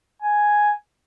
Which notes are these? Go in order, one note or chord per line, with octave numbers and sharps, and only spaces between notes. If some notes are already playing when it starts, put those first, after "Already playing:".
G#5